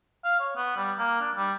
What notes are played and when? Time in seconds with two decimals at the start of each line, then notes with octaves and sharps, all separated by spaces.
0.24 F5
0.40 C#5
0.56 B3
0.76 G3
0.99 A#3
1.21 D4
1.35 G3